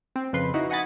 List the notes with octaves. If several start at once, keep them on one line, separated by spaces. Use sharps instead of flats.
C4
F2 C#3 B4 C6
D#4 E4 F#4
D#5 F#5 G#5 B5 A6